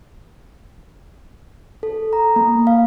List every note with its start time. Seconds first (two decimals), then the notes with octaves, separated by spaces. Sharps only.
1.83 A4
2.13 A#5
2.36 A#3
2.67 F5